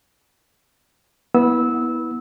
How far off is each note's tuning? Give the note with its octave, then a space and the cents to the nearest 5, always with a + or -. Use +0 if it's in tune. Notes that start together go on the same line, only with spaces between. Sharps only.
B3 -15 E4 -20 E6 -20